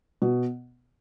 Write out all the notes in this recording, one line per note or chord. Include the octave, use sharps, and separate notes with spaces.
B2